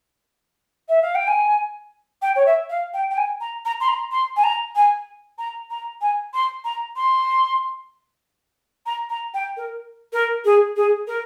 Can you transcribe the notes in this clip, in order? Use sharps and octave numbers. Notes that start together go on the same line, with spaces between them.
E5
F5
G5
G#5
G5
C#5
E5
F5
G5
G5
G#5
A#5
A#5
C6
A#5
C6
G#5
A#5
G#5
A#5
A#5
G#5
C6
A#5
C6
A#5
A#5
G5
A#4
A#4
G#4
G#4
A#4